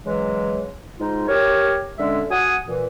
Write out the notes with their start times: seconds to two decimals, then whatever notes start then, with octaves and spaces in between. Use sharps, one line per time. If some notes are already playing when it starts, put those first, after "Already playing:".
0.05 C#3 E3 F#3 G#3
0.99 G#2 G#3 D#4 F4
1.28 G4 A#4 C#5
1.98 D3 G#3 C#4 E5
2.31 F#4 F#5 G#5 D#6
2.66 A#2 E3